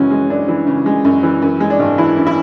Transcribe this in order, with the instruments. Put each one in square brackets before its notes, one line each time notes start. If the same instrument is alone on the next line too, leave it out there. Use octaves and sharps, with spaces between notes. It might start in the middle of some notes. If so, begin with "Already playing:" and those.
Already playing: [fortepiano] F#2 C#3 E3 G#3 C#4 F#4
G#3
F#2 D4
E3
C#3
G#3
F#2
E3
F#2
G#3
D4
G#1
E3 E4
F#2
E4